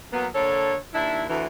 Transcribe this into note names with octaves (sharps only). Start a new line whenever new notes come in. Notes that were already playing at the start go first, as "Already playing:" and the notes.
F#3 A#3 B3
D3 A#3 A4 C#5
D#2 D4 E4
D2 E3